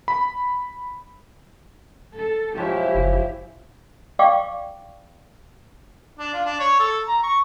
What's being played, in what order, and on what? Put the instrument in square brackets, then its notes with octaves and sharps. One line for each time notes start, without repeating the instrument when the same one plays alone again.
[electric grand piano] B5
[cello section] A4
[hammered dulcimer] F3 F#3 G#3 [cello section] E4 G4 E5
[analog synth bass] F#1
[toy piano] D5 F5 G5 C#6 D6
[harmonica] D4
F4
D4
C#5
A4
A#5
C#6